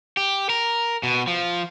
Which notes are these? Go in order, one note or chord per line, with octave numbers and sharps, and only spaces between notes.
G4
A#4
B2
F3